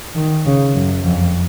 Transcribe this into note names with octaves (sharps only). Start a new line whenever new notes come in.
D#3
C#3
F#2
F2